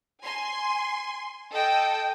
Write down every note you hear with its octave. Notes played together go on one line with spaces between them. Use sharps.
G#5 C6
A4 D#5 G5